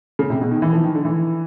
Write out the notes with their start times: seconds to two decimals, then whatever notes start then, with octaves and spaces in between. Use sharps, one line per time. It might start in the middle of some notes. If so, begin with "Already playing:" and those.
0.19 C#3
0.30 C3
0.41 B2
0.51 D#3
0.62 E3
0.73 F3
0.84 D#3
0.95 D3
1.05 E3